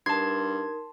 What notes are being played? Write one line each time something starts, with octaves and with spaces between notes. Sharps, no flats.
G2 D#4 A#4 A5 C6 G#6